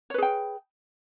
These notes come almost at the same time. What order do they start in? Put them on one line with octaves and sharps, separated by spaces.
C#5 B4 G#4 G5